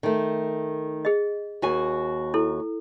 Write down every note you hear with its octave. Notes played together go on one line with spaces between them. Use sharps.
D#3 A3
G#4 D#5
D#2 F#4 G#5
E4 A4